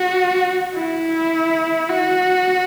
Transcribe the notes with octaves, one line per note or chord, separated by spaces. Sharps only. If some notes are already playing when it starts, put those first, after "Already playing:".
Already playing: F#4
E4
F#4